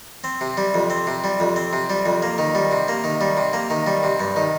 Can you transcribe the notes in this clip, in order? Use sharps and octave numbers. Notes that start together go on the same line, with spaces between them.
C4
C3
G3
F2
C4
C3
G3
F2
C4
C3
G3
F2
A#3
D#3
G3
C3
A#3
D#3
G3
C3
A#3
D#3
G3
C3
G2
D#3